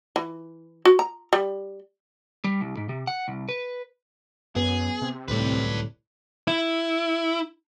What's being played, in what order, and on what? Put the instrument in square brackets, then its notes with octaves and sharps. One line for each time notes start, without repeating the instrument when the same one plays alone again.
[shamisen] E3
F#4
A#5
G3
[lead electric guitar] G3
C2
G#2
C3
F#5
C2
B4
[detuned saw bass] F#2 [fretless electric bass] B3 [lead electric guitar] G#4
[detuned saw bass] C3
[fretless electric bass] D1 C2 A2 [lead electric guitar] B4 D5
[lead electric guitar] E4